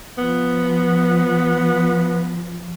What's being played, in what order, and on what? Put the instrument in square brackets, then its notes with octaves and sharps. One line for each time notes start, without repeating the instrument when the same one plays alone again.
[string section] F3 [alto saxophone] B3